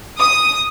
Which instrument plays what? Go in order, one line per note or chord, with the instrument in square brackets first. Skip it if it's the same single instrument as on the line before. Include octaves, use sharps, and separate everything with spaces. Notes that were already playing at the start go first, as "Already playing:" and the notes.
[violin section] D#6